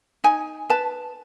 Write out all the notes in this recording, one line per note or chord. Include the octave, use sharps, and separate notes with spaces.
D#4 G#5
B4 A5